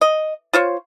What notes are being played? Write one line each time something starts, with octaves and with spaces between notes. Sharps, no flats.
D#5
F4 C5 C#5